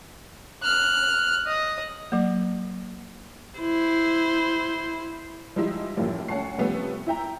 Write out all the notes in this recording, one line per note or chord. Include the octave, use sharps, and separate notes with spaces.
F6 F#6
D#5
F#3 A#3
E4 C5
F3 G3 G#3 D#4 E4
F#2 A2 E3 F3 G3 A#3
D2 C#4 F#5 A5 C#6 C7
C3 F3 G3 A3 B3 C#4
E4 E5 G5 A#5